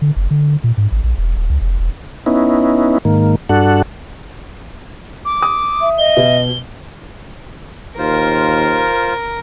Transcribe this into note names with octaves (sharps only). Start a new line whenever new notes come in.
D3
F#1
D3
A#2
G#2
G#1
A#1
E1
D#1
C#2
F1
E1
B3 C#4 D#4 E4
G#2 D#3 A#3
G2 D4 F#4 A4 F#5
D6
D#6
E5
D#5 G7
B2
D#2 F4 A#4 C5